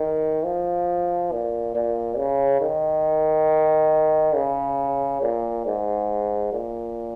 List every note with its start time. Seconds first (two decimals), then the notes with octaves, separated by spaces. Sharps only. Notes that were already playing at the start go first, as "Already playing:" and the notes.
Already playing: D#3
0.45 F3
1.32 A#2
1.75 A#2
2.18 C#3
2.61 D#3
4.35 C#3
5.22 A#2
5.65 G#2
6.53 A#2